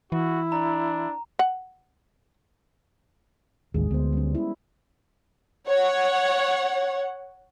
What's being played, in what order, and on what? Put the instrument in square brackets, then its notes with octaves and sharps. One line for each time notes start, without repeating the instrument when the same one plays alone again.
[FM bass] E3 [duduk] E4 [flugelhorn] F#4
[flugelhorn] D4 [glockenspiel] A#5
[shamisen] F#5
[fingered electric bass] A1 D#2 [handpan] G#3 G#4
[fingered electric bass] D2 [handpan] B3 C5
[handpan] G3 C#4
E4
[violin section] C#5 F#5